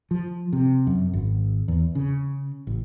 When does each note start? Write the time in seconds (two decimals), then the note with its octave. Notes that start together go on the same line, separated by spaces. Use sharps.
0.11 F3
0.53 C3
0.87 F#2
1.13 G#1
1.68 E2
1.95 C#3
2.67 A1